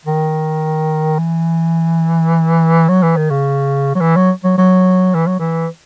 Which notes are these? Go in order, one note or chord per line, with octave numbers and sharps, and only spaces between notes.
D#3
E3
F#3
E3
D#3
C#3
F#3
E3
F#3
F#3
F#3
E3
F#3
E3